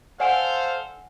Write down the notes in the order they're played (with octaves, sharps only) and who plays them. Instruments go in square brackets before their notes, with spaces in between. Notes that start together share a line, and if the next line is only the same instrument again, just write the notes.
[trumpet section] A4 C5 F5 [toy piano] D5 F#5 G#5